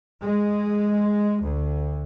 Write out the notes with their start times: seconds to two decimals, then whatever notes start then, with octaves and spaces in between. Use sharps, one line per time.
0.21 G#3
1.41 D2